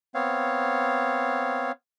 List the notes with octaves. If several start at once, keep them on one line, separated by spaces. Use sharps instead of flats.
B3 C4 C#5 F5